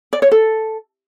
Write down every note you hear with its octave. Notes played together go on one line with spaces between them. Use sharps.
D5
C#5
A4